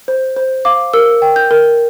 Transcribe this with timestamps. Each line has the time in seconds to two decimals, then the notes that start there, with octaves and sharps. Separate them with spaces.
0.08 C5
0.36 C5
0.65 F5 D6
0.93 A#4 E6
1.22 G5
1.36 G6
1.51 A#4